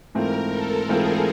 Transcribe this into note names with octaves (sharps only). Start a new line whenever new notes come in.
G#2 E3 A3 C4 F4 A#4
A4
G#2 E3 A3 C4 F4 G#4